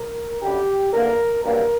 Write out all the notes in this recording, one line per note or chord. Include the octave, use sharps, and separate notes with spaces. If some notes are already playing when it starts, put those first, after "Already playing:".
Already playing: A#4
F#2 D3 G3 G4
E2 D3 A#3 A#4
G2 F#3 A#3 A#4